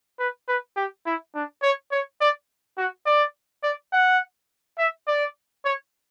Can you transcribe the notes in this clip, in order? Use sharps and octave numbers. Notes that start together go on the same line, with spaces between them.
B4
B4
G4
E4
D4
C#5
C#5
D5
F#4
D5
D5
F#5
E5
D5
C#5